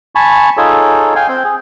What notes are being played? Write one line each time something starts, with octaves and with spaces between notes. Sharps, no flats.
G#5 A5 B5 C#6
D#4 F4 G#4 A4 C#5
F5 G5 G#5
C4 G5
G#4